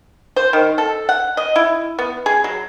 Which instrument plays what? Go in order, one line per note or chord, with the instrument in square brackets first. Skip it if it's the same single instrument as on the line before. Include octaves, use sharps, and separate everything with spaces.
[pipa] C5
D#3
A4
F#5
D#5
E4
B3
G#4
F#3